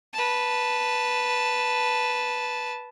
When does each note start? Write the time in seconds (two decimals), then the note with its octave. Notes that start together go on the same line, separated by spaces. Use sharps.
0.13 B4 A5